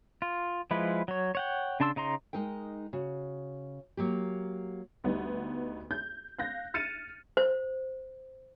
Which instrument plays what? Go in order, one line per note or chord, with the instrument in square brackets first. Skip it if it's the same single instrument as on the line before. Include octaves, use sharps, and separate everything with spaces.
[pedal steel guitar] F4
F3 G#3 E4 B4
F#3 C#5
C#5 F#5 G5
C#3 D4 A5 C6 E6
C#3 D#4 A#5 C6
[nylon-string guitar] G#3 D#4 A#4 G5
C#3 F#4
F#3 A#3 G4
[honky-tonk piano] D2 G3 B3 D#4
G6
F5 F#6 G6 A#6
F6 A6 C#7 D#7 E7
[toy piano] C5